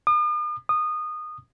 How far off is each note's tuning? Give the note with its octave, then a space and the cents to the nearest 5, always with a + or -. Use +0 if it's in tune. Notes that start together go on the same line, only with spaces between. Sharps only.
D#6 -45
D#6 -20